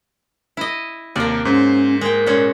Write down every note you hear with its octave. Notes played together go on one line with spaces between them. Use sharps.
E4 D#5
D#2 C3 A#3 D5
G#2 C#4 C5
G#3 A#4 G5
A#2 G#3 C#4